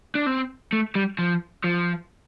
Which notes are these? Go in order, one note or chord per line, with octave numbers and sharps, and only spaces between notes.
D4
C4
A3
G3
F3
F3